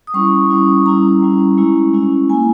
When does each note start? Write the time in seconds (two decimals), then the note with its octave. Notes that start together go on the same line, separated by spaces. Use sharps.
0.07 D#6
0.14 G3 C#4 E4 C#6
0.50 G3 C#4 E4
0.86 G3 C#4 E4 A#5
1.22 G3 C#4 E4
1.58 G#3 C#4 E4
1.94 G#3 C#4 E4
2.30 A#3 E4 G#5